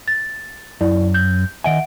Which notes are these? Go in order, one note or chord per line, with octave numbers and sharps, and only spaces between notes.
A6
F#2 E4 D5
G6
D#3 D#5 E5 F#5 G#5 D7